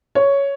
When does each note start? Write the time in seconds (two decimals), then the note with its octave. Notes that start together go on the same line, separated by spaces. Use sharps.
0.15 C#5